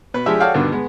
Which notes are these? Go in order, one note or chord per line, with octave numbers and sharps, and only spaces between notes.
B2 B4
F3 G#3 D4 G4 G#4 E5
F#4 A4 C#5 D5 F5 G5
G2 B2 D3 D#3
G#3 B3